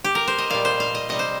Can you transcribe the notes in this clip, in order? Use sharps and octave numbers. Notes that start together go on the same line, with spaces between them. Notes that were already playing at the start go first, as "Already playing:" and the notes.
G4
A#4
C5
D#5
A#2 G3 F5
C5
F5
D#5
C3 G3 D#5
C5